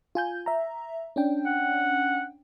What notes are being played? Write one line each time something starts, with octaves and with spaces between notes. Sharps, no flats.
F4 G#5 G6
E5 A#5
C#4 D4 G5
F#5